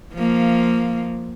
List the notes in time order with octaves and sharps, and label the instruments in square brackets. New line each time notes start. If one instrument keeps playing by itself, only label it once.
[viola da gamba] F3 A#3